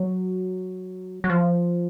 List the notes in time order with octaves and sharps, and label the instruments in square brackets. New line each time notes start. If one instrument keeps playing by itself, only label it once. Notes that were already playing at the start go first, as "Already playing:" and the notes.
Already playing: [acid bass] F#3
F#3
F3